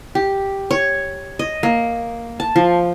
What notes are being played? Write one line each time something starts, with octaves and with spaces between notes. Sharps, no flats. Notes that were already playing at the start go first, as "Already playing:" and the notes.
G4
C#5
D#5
A#3
A5
F3